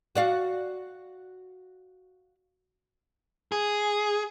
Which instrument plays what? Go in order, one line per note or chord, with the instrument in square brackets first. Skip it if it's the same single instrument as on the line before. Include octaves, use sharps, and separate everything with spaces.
[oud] F#4 D5 F5
[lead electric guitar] G#4